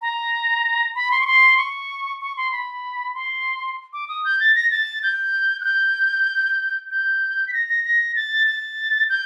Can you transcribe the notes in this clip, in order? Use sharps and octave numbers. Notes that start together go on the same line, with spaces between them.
A#5
B5
C6
C#6
C6
C#6
C#6
C6
B5
C6
D6
D#6
G6
A6
A#6
A6
G6
F#6
G6
G6
B6
A#6
A#6
A#6
A6
A6
G6